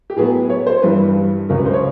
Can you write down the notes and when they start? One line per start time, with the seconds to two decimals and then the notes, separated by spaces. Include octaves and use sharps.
0.10 G4
0.16 A2 F#3 B3 G#4
0.50 C#5
0.67 C5
0.83 G2 E3 G3 B4
1.49 C#2 C#3 F#3 A#4
1.57 B4
1.66 C5
1.73 C#5